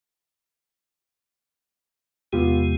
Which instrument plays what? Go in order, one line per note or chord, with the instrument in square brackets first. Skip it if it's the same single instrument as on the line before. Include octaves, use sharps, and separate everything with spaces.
[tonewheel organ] E2 C3 G#3 [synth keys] B3 F4 G4